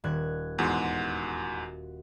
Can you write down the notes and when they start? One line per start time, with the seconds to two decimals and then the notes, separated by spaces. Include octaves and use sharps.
0.04 D#1 F#6 G#6
0.58 E2 G#2 F#4 F#5 C6